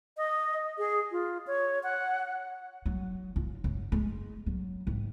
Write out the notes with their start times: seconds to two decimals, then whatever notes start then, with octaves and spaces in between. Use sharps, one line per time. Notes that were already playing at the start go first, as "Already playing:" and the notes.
0.17 D#5
0.78 G#4
1.11 F4
1.47 C#5
1.83 F#5
2.86 F#3
3.36 F4
3.64 F#2
3.92 G#3
4.46 F#3
4.87 G#1